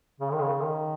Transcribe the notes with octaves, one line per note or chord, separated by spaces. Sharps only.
C#3
D#3
C#3
D#3